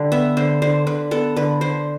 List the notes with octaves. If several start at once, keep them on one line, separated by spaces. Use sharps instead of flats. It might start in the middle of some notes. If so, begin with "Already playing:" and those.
Already playing: D3 G3
B3 E5
D3 C5
D3 C5
D3 B4
B3 A4
D3 B4
D3 C5